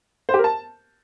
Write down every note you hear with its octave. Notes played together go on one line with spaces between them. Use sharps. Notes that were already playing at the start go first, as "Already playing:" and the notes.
C5
G4
A#4
A5